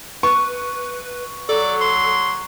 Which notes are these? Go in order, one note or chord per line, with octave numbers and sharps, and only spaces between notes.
B4 C#6
F#3 A4 D5
C6